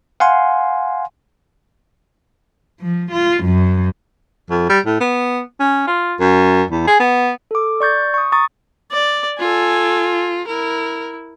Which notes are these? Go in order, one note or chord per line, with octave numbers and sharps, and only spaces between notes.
F5 F#5 G#5 C6
F3
F4
F#2
F2
G3
A2
B3
C#4
F4
F#2
E2
G#4
B3
A4 D6
D5 C#6 G6 A6
C#6 D#6
A#5 C#6 D#6 A6
D5
F4 A4 G#5
E4 A#4